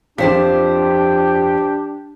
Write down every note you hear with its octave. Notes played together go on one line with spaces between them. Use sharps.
F2 F3 D4 G4 C5 A5 B6